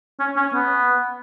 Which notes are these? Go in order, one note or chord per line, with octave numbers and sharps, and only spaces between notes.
C#4
C#4
B3